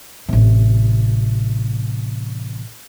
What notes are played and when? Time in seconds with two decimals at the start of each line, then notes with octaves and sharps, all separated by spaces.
0.28 A1 C3